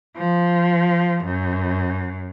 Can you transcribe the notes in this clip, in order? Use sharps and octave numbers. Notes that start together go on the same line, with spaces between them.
F3
F#2